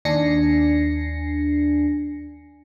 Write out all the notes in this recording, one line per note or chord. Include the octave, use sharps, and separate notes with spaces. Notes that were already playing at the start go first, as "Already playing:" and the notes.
D#2 D4 G#5 A#6 C7 C#7